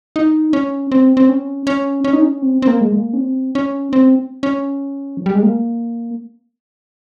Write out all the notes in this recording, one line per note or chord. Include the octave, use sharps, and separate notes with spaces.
D#4
C#4
C4
C4
C#4
C#4
C#4
D#4
C#4
C4
C4
A#3
G#3
A#3
C#4
C4
C#4
C4
C#4
F3
G3
G#3
A#3